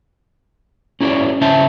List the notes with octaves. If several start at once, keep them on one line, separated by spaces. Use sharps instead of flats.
C#4 E4 F#4 G#4 C#5 D5
C#3 C#4 C5 C#5 E5 A5